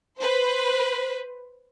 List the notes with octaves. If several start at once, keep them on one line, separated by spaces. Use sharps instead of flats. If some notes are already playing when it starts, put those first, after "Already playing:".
B4 C5